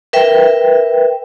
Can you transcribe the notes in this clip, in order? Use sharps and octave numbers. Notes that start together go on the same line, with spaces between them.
A#4 B4 E5 G5